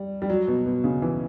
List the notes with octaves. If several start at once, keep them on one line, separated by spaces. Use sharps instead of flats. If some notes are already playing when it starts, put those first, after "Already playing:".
Already playing: G3
G3
F#3
B2
B2
C#3
E3